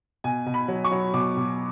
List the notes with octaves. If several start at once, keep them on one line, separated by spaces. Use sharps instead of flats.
B2 G#5
B2
B5
F#3
C#6
F#3
B2 D6
B2